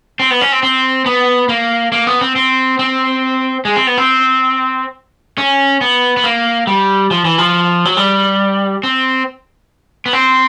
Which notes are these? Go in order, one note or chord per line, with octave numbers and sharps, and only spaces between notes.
C4
B3
C#4
C4
C4
B3
A#3
A#3
B3
C4
C4
C4
G#3
C4
B3
C4
C#4
B3
B3
A#3
G3
F3
E3
F3
F#3
G3
C4
B3
C4